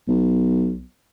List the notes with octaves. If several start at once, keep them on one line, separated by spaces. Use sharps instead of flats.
B1